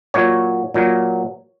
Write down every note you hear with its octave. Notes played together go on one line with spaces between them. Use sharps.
A#2 F#3 C#5
A#2 F#3